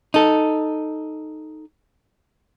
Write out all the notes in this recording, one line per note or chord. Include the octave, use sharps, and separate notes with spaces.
D#4 A4